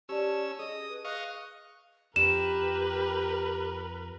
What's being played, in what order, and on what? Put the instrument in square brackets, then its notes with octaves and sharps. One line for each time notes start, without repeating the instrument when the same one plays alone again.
[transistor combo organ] C#4 E6 [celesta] G4 D5 [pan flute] A5
[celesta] G#4 [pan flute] D#5 [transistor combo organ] D#6
[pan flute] B4
[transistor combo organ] D#5 F5 C#6 [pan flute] F#6
[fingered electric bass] F2 [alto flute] G4 [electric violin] A#4 B4 [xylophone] E7